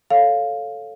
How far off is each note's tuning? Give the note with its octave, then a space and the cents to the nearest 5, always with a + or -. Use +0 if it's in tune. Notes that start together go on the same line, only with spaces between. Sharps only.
A4 +0 C#5 +0 F5 +0